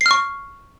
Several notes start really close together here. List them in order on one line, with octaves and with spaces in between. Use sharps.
C7 F6 C#6